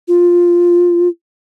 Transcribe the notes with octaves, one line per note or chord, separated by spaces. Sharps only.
F4